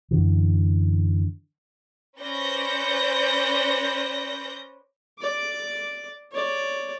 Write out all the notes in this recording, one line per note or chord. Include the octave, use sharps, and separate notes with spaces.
F#2 D3 E3
C#4 B4 C5 D5 G6 A#6
D5 D6
C#5 D5